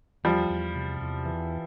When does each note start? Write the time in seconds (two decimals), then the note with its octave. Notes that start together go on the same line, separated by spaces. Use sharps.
0.24 E2 F3 G3
0.50 E2
0.75 C3
1.01 E2
1.25 E3